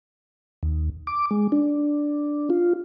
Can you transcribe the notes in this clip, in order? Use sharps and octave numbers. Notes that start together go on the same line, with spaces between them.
D#2
D6
G#3
D4
F4